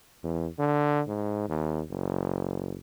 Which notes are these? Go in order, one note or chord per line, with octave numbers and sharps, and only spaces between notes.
E2
D3
G#2
D#2
F#1